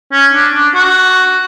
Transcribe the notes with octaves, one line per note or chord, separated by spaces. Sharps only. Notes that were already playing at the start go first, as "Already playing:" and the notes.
C#4
D4
D4
F#4